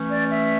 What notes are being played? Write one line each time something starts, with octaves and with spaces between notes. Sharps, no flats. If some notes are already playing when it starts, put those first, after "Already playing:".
Already playing: E3 A3 C#4
D5
E5